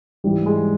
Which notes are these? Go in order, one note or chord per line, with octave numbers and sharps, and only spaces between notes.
G#2 E3 G3
G#3